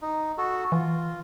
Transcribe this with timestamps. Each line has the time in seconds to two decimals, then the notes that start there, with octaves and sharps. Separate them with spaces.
0.02 D#4
0.38 F#4 A4
0.72 E3 F4